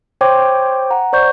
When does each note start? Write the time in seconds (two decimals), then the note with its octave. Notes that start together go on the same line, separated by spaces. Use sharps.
0.21 C5 C#5 G5 C6 D6 G#6
0.91 F#5 A#5
1.13 C5 D5 C#6 G6